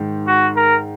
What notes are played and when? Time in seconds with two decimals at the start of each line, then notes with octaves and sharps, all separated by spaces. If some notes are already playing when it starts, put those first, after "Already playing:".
Already playing: G#2 D#3
0.27 F#4
0.56 A#4